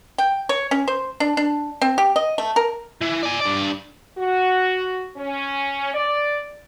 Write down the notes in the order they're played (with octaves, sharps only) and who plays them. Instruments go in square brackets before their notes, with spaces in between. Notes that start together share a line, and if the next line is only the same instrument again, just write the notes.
[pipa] G5
C#5
C#4
C5
D4
D4
C4
G4
D#5
A3
A#4
[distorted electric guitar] E3
D5 G#5
G2 D5
[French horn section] F#4
C#4
D5